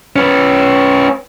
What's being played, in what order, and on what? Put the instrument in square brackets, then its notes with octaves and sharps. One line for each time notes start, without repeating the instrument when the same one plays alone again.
[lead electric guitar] C#4 B4